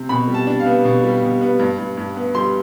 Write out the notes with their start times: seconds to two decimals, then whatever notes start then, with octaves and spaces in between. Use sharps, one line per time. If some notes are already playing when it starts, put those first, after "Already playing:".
Already playing: C3
0.09 B2 B5
0.28 G3
0.34 A5
0.47 D4
0.60 F5
0.66 B3
0.85 B2
1.04 G3
1.22 B2
1.41 B3
1.59 G2
1.78 G2
1.97 G2
2.17 B3
2.35 G3 C6